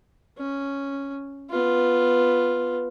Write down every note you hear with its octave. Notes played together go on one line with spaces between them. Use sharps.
C#4
B3 F4